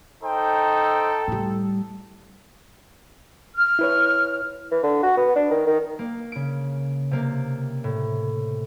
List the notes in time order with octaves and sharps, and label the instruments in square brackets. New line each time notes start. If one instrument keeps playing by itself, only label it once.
[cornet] D#4 [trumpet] A4 [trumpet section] C5 G5
[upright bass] A2 G3
[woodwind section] F6
[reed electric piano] E4 B4 C#5
[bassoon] E3
D3
F#4
B3
D4
D#3
D#3
[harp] A#3
C#3 D7
C3 A#3
A2